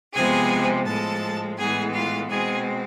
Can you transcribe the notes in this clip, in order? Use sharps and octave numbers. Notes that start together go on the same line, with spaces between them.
C3 F3 G#3 B3 G#4 G#5
A2 F3 G#3 A4 A5
A2 E3 G#3 B3 G#4 G#5
F4 F5
B2 G#3 C4 G#4 G#5